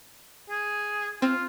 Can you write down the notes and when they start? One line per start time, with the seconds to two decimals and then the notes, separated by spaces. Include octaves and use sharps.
0.50 G#4
1.22 C4 F4